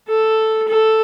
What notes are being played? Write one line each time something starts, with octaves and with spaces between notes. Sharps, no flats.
A4
A4